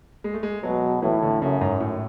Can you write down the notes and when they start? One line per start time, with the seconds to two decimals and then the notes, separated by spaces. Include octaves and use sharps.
0.24 G#3
0.34 A3
0.43 G#3
0.63 B2 F#3
1.02 A2 E3
1.22 D3
1.42 F#2 C#3
1.61 G#2
1.80 A2